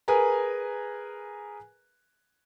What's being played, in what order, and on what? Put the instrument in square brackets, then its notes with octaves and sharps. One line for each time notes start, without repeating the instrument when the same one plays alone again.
[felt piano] G#4 A#4 B4 G#5 A#5